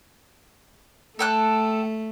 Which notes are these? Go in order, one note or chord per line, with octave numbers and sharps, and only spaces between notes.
A3 A4 G5 F#6